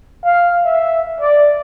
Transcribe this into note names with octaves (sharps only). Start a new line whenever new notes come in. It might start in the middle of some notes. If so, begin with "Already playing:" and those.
F5
E5
D5